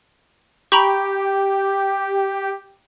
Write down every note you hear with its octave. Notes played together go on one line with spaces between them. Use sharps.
G4 A#5 B5 C#6